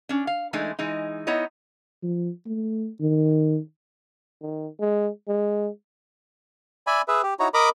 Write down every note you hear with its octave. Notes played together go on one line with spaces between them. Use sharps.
C#4 D4
F5
E3 G#3 A3 D4 D#4
E3 G#3 D#4
B3 D#4 E4 C#5 D#5
F3
A3
D#3
D#3
G#3
G#3
D5 E5 G#5 B5
G#4 B4 E5
G4
D#4 E4 F#4 C#5 A#5
A#4 D#5 A#5 B5 D6